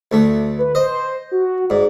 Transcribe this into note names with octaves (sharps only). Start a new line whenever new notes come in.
D2 A3
B4
C5 D#5
F#4
G#2 D5